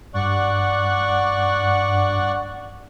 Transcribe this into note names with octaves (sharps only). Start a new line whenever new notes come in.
G2 D5 F#5 C#6